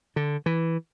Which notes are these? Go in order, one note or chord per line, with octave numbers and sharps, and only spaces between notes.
D3
E3